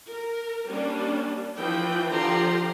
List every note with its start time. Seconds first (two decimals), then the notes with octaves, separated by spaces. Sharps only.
0.11 A#4
0.68 G3 A#3 C#4 D4
1.57 E3 F3 G5
2.12 D3 F3 F4 G4 A#5 C6